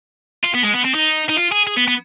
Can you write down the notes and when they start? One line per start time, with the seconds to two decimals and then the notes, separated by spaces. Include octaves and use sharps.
0.44 F4
0.55 B3
0.64 G#3
0.74 B3
0.85 C4
0.94 D#4
1.29 D#4
1.37 F4
1.52 G#4
1.67 G#4
1.76 B3
1.88 B3